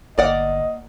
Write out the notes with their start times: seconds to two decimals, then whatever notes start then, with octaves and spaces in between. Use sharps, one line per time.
0.18 G1 A#3 D5 D#5 F#5